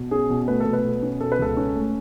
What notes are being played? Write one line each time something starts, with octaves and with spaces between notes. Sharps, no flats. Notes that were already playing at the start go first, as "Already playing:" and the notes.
Already playing: B2
C#4 G#4
B2
A3 B4
A4
B2
B4
B2
C#4
B2 A4
B4
C#2 A4
C#4
A3